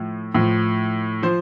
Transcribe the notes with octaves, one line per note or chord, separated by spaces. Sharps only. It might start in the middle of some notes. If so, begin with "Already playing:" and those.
Already playing: A2 F3
A2 F3
F3 C5